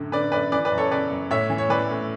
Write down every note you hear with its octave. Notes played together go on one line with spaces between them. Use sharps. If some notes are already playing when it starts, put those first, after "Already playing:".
Already playing: F#2 A2 D3
D3 B4 D5
F#2 B4 D5
E3 B4 D5
B4 D5
F#2
A4 C#5
C#3 B4 D5
F#2
A2 C#5 E5
E3
C#5
E3 B4 D5
A2